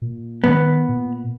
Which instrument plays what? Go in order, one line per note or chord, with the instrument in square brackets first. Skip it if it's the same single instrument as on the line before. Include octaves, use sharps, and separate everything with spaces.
[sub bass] A#2
[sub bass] D#3 [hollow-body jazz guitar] B3
[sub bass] A#2